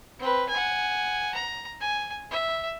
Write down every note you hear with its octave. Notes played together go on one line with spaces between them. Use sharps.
C4 B4
F#5 G#5
A#5
G#5
E5